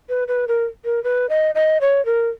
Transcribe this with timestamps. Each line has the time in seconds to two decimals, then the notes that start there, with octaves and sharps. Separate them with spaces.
0.09 B4
0.28 B4
0.48 A#4
0.85 A#4
1.04 B4
1.29 D#5
1.55 D#5
1.81 C#5
2.05 A#4